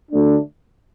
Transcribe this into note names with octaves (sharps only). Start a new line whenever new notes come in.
D2 D3 A3 D4